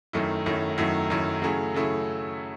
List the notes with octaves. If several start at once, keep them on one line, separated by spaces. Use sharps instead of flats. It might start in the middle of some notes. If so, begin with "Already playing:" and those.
F#2 D#3 F#3 A3 E4
F#2 D#3 F#3 A3 E4
F#2 D#3 F#3 A3 E4
F#2 D#3 F#3 A3 E4
C#3 F#3 A3 E4 G#4
C#3 F#3 A3 E4 G#4